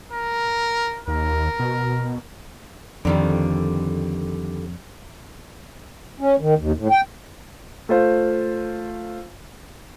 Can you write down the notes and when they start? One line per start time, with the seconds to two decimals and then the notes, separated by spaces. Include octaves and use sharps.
0.12 A#4
1.08 D#2 A#4
1.59 B2
3.05 F2 D3 D#3 G3
6.20 C#4
6.40 D#3
6.59 D#2
6.77 A2
6.91 G5
7.89 A3 F4 C5